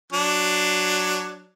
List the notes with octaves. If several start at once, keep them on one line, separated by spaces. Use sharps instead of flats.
F#3 D4